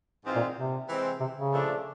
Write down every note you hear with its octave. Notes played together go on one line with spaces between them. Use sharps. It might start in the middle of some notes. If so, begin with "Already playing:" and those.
G#2 E3 G#3 C4 F4
A#2
C3
E3 G#3 C4
C3
C#3
A#2 F3 A3 D4